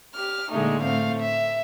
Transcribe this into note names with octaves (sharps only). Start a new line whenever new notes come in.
G4 F6
A#2 D3 G#3 A3 D#4
A2 A3 C4 F5
E5